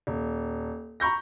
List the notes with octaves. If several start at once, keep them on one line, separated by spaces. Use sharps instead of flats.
D#1
A#5 B5 C#6 G6 A#6